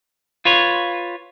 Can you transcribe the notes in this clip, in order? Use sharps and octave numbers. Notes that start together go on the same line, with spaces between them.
F4 B4 C#5